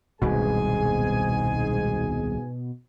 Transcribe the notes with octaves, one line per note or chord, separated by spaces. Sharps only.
D#1 C2 G#2 B2 G#4 G#5